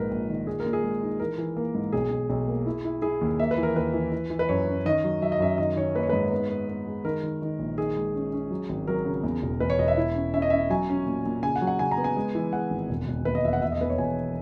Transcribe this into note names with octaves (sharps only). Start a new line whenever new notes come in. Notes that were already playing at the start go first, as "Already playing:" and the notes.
Already playing: A#1 G#2 A#4 B4
A#1
D#3
A#2 G#4
A#4
A#2
G#4
G#3
D#4
E3 A#4
E3
A#3
G#2
B1 G#4
B1
B1
A#3
E4
E4
E4 G#4
D#2
A#3 E5
B4
E3
A#4
D#2 B4
E3
E3
E3
B4
F#2 C#5
C#4
D#3 D#5
F#3
F#3 E5
D#5
F#2 E5
D#3 D#5
D#3 C#5
A#3 B4
C#5
G#2 B4
B3
B3
B3
G#3
D#3 A#4
D#3
D#3
A#1
D#3 G#4
G#3
C#4
C#4
F#3
G#1
F#3 A#4
C#3
E2
E1
E2 B4
C#5
E1 D#5
E5
E4
C#4
C#4 E5
D#5
C#4 E5
F#3 G#5
C#4
A#2
A#2
C#3 G#5
F#5
F#3
F#5
C#3 G#5
A#5
B3
G#5
G#3
E3
G#3 F#5
G#1
E1
E1
D#2 B4
D#5
E1 E5
F#5
E1 E5
D#5
E2 B4
C#5
E1 G#5